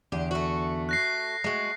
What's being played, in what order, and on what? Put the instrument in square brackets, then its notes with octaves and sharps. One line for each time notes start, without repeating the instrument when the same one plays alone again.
[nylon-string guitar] E2 D3 [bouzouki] G4
[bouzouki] A3 F#4
[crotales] F#6 A#6 C7
[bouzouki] G#3 F#4 [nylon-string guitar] A3